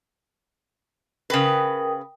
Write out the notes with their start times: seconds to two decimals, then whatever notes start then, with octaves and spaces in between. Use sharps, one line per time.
1.30 C#3 A#4 B4 G5 D#6